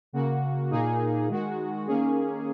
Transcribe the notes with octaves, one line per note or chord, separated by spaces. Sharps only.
C#3 A#3 F#4
A#2 A#3 D#4 G#4
D#3 G#3 F#4
D#3 A#3 C#4 G#4